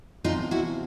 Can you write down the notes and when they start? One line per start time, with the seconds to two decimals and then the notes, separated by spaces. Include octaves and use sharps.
0.24 E2 C3 F3 D#4 F4
0.51 E4 F#4